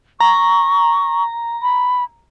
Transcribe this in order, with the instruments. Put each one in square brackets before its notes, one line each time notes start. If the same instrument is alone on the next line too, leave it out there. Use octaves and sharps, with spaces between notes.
[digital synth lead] A#5 [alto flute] C#6
[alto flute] B5